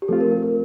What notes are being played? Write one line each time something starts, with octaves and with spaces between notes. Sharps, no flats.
G4
F3 A3 C4 F4 A4
A#4
A#4
A#4